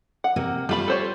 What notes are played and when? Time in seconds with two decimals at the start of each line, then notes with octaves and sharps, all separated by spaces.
0.24 F#5
0.36 C3 A#3
0.69 F3 G3 A3 F4 B4 B5
0.88 A4 C5 C#5